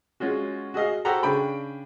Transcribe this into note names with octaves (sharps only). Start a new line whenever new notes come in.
G#3 C#4 F4 F#4
F#4 G#4 D#5 F5
F#4 G4 A4 C5 F#5 A#5
C#3 D4 G5 B5